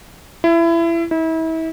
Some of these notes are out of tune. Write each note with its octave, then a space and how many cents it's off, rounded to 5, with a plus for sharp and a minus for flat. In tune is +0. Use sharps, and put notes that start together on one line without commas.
E4 +25
E4 -35